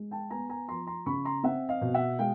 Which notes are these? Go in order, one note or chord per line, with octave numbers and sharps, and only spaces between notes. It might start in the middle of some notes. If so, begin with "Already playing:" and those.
Already playing: G#3
G5 A5
B3 G#5 A#5
G#5 A#5
F3 A#5 C6
A#5 C6
C#3 B5 C#6
A#5 C6
C4 E5 F#5
D#5 F5
B2
E5 F#5
G#3 F5 G5